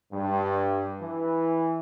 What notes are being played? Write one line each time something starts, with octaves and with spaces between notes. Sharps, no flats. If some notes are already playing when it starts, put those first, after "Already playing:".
G2
E3